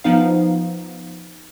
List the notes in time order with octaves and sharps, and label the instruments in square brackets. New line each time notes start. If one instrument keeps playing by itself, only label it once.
[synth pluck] F3 B3 D#4 F5